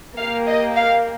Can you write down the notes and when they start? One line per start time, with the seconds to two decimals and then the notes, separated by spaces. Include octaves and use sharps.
0.18 A#3 G4 F5
0.46 D#5
0.75 F5